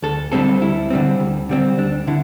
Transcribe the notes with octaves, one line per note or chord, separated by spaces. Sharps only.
D2 A4
D3 G3 C4 A4
D2 E4
D3 G3 C4
D2
D3 G3 C4
D2 D4
D3 E4